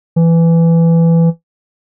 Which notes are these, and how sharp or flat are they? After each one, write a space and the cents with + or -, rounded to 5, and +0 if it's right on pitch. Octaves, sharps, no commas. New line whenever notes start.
E3 +15